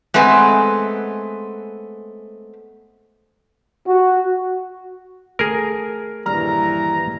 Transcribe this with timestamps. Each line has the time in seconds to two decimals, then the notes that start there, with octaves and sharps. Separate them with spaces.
0.14 G#3 A3 B3 C4 G#5
3.86 F#4
5.39 A3 G#4 A#4
6.26 D#1 G2 E3 A#5 F6